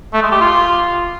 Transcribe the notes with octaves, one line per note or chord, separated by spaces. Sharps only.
A3
G#3
G4
F4